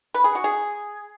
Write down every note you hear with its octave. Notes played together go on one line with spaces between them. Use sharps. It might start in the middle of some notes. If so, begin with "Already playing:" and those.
B4
G#4
F#4
G#4